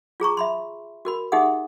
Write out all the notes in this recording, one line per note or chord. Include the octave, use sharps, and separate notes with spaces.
F4 G#4 A#5 C#6
E5 B5 C6
F#4 A#4 B5
D#4 G4 G#4 E5 F#5 D#6